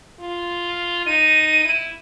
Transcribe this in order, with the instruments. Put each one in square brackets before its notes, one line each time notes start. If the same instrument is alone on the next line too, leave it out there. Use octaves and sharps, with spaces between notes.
[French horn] F4
[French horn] D#4 [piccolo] D#7
[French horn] E4